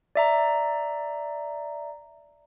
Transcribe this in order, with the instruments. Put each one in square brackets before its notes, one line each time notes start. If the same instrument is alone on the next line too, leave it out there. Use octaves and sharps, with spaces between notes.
[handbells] D5 E5 A#5